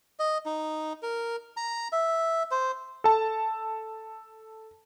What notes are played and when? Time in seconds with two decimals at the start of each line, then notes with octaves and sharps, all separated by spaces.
0.19 D#5
0.46 D#4
1.02 A#4
1.57 A#5
1.92 E5
2.51 C5
3.04 A4 A5